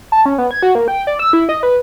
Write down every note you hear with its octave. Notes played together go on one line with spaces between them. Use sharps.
A5
C#4
B3
G#6
F#4
A#3
G5
D5
E6
E4
D#5
B4